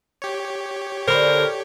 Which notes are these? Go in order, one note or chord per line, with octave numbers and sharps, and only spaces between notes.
G4 C#5
D3 A#4 C5 B5